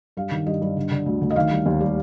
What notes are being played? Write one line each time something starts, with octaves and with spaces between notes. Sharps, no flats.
G2 F5
D#3
G2 D#5
G2
D3
D3
D2
D2
D#5
D#3 F5
G3
D#2
G3